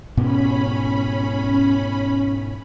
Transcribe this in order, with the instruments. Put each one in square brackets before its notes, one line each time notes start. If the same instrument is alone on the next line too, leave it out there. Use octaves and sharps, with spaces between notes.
[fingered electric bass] G#2 B2 B3 [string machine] C#4 B5